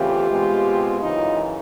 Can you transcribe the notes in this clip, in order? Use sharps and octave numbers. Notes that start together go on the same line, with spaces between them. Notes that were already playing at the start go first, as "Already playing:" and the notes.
Already playing: E2 C#3 E3 A3 C4 F4 G4
B2 G#3 C4
F#2 C#3 E3 D#4 F4